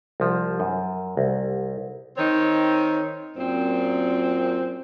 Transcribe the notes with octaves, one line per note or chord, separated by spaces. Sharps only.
C2 F3
F#2
C2
D#3 C4 D#4 C#5
F#2 A#2 C4